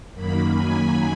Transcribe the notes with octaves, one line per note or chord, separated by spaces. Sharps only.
F#2 D#3 F#3 A#3 B5
G#5